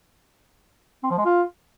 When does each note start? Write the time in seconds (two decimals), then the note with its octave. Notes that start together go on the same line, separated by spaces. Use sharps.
1.03 C4
1.11 F3
1.18 G#3
1.25 F4